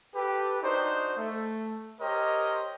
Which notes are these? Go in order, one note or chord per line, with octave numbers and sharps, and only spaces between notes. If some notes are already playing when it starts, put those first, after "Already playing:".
G4 A4 B4
D4 D#4 F#4 C5
A3
G4 A#4 C5 C#5 D#5